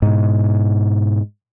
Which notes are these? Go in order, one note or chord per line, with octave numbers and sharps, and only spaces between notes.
G#2 B2